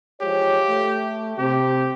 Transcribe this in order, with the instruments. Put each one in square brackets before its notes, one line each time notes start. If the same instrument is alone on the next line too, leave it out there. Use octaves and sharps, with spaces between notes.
[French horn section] F3 G#3 C#5 [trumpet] G4
[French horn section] A3
[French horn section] C3 [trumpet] G4